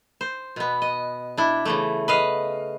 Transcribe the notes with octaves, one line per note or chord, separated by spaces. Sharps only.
C5
B2 B3
D#5
D4 E4
C#3 E3 A3
B4 D#5 F5